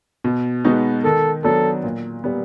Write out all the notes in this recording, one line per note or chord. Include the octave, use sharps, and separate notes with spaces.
B2
G#3 B3 D#4 F#4
D#3 A4
F#3 B3 D4 A4
A#2
G3 B3